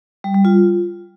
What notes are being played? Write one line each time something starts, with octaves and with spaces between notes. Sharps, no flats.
G3
G3
F4